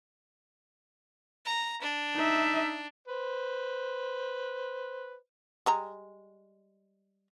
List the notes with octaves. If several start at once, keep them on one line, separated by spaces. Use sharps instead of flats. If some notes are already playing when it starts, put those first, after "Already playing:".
A#5
D4
D#4 E5
B4 C5
G3 G#3 A#5